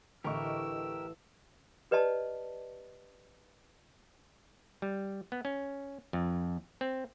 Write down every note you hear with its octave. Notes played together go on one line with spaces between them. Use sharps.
A1 D3 G4 A#4 D#5 C#6 E6
G4 B4 D5 D#5 A5
G3
B3
C#4
F2
C4